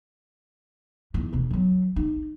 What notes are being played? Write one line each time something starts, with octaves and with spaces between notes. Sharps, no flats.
E2 D#3
F1 B2
D#3 F#3
D#4